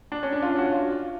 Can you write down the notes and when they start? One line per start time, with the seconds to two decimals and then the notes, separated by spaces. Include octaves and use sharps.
0.12 D4
0.23 C#4
0.33 D4
0.42 F4
0.58 F#4
0.74 F4